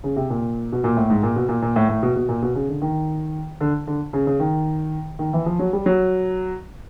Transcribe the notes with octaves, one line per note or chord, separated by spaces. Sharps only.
C#3
C3
A#2
B2
A#2
A2
G#2
A#2
B2
A#2
A#2
A2
A2
B2
B2
A#2
B2
C#3
D3
D#3
D3
D3
C#3
C#3
D#3
D#3
E3
F3
F#3
G3
F#3